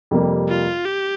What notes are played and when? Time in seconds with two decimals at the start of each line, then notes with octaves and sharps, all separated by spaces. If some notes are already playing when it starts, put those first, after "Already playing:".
0.11 F2 C3 G3 A#3
0.49 F4
0.86 G4